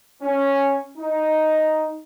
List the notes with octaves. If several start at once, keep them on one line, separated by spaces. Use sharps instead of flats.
C#4
D#4